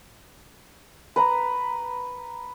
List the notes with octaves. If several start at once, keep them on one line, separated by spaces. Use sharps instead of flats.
B4 A#5